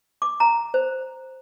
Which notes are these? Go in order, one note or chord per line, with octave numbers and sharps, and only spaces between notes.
D6
A#5
C5